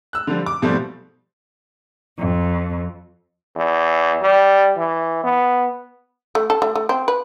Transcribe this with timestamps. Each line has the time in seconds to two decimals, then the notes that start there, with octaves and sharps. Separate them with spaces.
0.13 E6 F#6
0.27 D3 F3 G3
0.46 D6
0.62 G#2 B2 F3 G3 A3 C4
2.17 F2
3.56 E2
4.22 G3
4.77 E3
5.24 B3
6.35 A3
6.50 A4
6.62 A3
6.75 A3
6.89 C4
7.08 B4